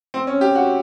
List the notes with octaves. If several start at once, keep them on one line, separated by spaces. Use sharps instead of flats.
C4
C#4
G4
F#4